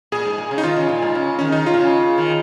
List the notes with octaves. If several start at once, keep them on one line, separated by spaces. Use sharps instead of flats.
A#2 G#4
G#2
A#2
C#3
D#4
D#3 F4
C#3
A#2
G#2
C#3
D#3 C#4
D#4
C#3 F4
A#2
C#3
D#3